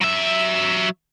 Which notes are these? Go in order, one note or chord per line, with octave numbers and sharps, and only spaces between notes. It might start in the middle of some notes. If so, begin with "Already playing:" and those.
F#3 E5